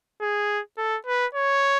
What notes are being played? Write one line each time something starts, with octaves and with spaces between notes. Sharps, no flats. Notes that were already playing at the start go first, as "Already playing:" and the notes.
G#4
A4
B4
C#5